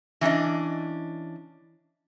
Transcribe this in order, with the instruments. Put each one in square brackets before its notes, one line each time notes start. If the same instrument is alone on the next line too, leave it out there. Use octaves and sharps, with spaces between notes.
[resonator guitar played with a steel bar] E3 C#4 D4 D#5